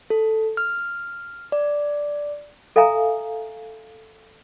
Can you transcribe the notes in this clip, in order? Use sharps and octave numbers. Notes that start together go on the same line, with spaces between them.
A4
F6
D5
A4 E5 F5 G#5 A#5